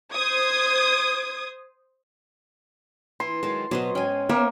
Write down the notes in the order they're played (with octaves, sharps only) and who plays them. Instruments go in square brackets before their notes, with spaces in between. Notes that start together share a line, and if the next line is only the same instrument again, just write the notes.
[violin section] C5 D#6 G#6
[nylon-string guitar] E3 [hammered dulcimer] C6
[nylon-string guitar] D#3 F#3 G#3 [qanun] A5
[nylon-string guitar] B2 F#4 [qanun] F#3 C5 D#5
[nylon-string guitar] G#2 [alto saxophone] C#4 [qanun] G5 G#5
[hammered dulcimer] A#3 [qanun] B3 A#4 E5 [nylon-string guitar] C5 C#5